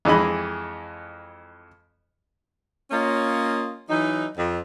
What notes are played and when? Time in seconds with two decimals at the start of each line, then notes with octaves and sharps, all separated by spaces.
0.05 F2 E3 G#3 D#5 B5
2.91 A#3 C#4 F4 C#5 D#5
3.89 E3 F#3 D#4
4.37 F2